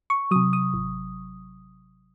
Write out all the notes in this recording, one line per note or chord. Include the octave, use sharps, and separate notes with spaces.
C#6
C3 F#3 D#6
D#6
G#1